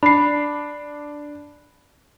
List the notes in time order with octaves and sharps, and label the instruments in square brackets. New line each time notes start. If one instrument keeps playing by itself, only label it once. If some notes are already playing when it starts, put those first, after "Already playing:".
[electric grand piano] D4 [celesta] B5 C7